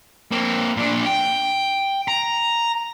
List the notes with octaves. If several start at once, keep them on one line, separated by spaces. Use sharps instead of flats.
A#3 C4
A#2 D4
G5
A#5